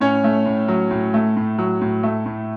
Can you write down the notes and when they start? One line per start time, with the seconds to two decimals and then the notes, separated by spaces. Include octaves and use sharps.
0.01 A2 C#4 C#5
0.24 A3
0.46 A2
0.68 F#3
0.91 A2
1.14 A3
1.37 A2
1.58 F#3
1.81 A2
2.03 A3
2.26 A2